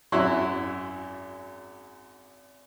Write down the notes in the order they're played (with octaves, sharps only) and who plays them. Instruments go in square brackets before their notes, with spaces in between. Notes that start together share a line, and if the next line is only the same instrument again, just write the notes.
[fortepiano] G#1 F#2 F#3 E4 G#5 C6